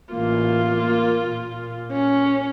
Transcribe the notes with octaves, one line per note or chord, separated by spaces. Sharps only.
A1 A#3 F4
A#3
A#2
C#4